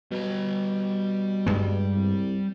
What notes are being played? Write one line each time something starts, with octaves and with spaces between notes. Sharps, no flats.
B2 G3 A#5
G2 G#3
C2